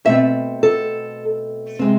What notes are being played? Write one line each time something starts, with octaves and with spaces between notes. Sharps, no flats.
B2 A3 C4 E5
A4
C3 G#3 C4